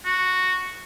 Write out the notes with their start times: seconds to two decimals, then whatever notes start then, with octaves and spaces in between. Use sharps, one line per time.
0.05 F#4